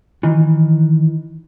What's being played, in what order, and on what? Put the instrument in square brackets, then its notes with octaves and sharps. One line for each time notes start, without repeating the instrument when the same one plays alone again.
[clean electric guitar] D#3 E3